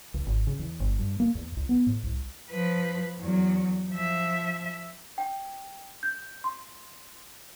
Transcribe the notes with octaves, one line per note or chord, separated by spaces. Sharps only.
C#2
G#1
C#3
E2
G1
G2
A#3
E2
C#2
B3
A2
C2
F3 B4
E2 F#3
F3 E5
G5
G6
C6